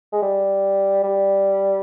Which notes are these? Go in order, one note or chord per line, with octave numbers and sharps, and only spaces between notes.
G#3
G3
G3